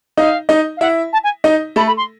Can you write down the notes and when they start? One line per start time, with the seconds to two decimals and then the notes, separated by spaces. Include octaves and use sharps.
0.17 D#4 D#5 F5
0.49 D#4 D#5
0.77 F5
0.81 E4 E5 F#5
1.12 A5
1.23 G#5
1.44 D#4 D#5
1.76 A3 A4 B5
1.87 B5
1.97 C6